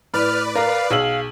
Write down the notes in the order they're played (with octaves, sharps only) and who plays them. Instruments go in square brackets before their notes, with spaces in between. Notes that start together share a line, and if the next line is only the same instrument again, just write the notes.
[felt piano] A2 [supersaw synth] B4 D5 [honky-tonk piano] B5 [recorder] F6
[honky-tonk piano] A#4 [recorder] F5
[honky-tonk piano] B1 E6 F#7 [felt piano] G#4 [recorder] F5